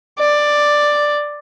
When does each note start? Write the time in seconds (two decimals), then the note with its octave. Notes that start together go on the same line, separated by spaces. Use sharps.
0.19 D5